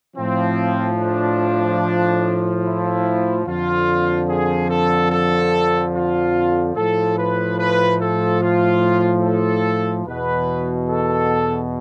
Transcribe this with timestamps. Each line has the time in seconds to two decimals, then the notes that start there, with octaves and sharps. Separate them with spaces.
0.16 A2 F3 C4
0.98 D4
2.63 E4
3.46 F2 D3 F3 F4
4.29 G#4
4.69 A4
5.11 A4
5.93 F4
6.76 A2 F3 A4
7.17 B4
7.59 B4
8.01 A4
8.41 F4
9.24 A4
10.06 E2 B2 B4
10.89 A4